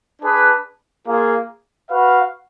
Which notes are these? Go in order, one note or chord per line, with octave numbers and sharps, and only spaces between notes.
D4 G#4 B4
A#3 F4 G#4
F#4 B4 F5